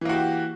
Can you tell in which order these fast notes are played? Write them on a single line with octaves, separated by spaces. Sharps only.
E3 A#3 F#4 G4